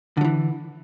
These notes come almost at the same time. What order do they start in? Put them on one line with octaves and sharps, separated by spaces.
D3 F#3 E3